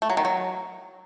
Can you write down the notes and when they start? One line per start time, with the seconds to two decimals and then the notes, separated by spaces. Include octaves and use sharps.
0.02 A3
0.10 F#3
0.17 D#3
0.25 F#3